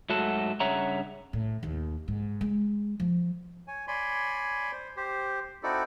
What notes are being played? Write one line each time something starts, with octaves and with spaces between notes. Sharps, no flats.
G#2 F#3 A3 F#4 A4
G2 C#3 C#5 E5 F#5 A#5
A2
D#2
G#2
G#3
F3
C#5 G#5
C#5 D5 G#5 B5 C6
C5
G4 C5
C4 D#4 E4 F#4 A4 D5